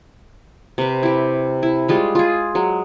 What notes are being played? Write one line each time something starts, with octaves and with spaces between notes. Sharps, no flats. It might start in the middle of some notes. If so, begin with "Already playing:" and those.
C3 B4
E4 G4
E4
G3 G#3 F4 B5
F4 G#4
F#3 G#3